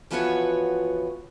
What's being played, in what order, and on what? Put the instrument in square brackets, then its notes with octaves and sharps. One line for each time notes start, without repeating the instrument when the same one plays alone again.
[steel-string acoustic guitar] E3 F3 B3 F#4 B4 C#5